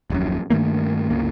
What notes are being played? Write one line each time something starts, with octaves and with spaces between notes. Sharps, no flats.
D#1 A#1 F#2
G2 D#3 A3 A#3
G1 C#2 A#3